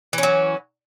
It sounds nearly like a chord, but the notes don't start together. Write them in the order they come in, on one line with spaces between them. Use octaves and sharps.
E3 C#4 F#3